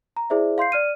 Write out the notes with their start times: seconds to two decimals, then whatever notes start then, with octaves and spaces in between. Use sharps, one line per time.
0.17 A#5
0.30 E4 G#4 C5 D5 E5
0.58 F5 C6 G6 C7
0.72 D5 F6 D#7